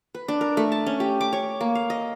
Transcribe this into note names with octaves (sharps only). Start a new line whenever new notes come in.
B4
D4
A#4
A3
A5
C#4
G4
D6
C#5
A#3
F5
D#5